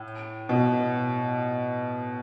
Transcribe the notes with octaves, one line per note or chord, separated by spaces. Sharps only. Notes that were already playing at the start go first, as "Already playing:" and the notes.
Already playing: A2
B2